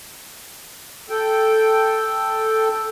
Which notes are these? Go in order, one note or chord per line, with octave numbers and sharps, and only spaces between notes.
A4 G5